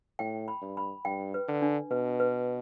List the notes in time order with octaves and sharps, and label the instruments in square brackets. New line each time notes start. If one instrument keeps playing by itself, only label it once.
[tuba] A2 [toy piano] G5
[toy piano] B5
[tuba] G2
[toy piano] B5
[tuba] G2 [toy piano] G5
[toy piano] B4
[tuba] D3
[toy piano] D4
[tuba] B2 [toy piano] B4
[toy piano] B4